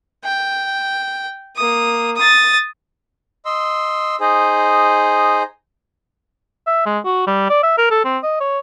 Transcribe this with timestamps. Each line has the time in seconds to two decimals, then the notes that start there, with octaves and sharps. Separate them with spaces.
0.25 G5
1.57 A#3 D#6
2.16 D#6 A6
3.45 D#5 C6 E6
4.20 D#4 G#4 C5
6.67 E5
6.86 G#3
7.05 F#4
7.27 G3
7.50 D5
7.63 E5
7.78 A#4
7.91 A4
8.05 C4
8.23 D#5
8.40 C#5